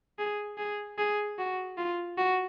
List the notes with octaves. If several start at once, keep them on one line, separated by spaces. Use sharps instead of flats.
G#4
G#4
G#4
F#4
F4
F#4